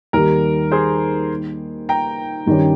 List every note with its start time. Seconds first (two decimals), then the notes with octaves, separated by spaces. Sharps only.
0.13 D#2 D#3 G3 A#4
0.71 G#4 C5
1.89 G5 A#5
2.46 G2 D#3 G3 C#4 G4